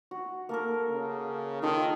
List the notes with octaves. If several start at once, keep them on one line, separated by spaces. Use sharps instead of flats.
F#4
A#3 A4 A#4
C#3
D#3 D#4 F4 A4